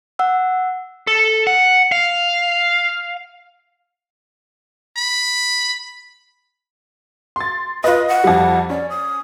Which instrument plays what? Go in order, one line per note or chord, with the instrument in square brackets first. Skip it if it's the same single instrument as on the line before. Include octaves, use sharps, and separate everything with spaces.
[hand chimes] F#5 E6
[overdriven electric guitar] A4
F#5
F5
[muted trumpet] B5
[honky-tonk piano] C6 A6
[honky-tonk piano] F4 D#5 [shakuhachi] B4
[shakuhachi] F#5
[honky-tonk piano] F2 G3
[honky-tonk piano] C#4 [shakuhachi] D5
[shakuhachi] D#6